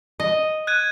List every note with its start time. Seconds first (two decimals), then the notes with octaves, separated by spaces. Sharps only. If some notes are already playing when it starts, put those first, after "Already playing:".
0.20 D#5
0.67 F#6 G#6 D#7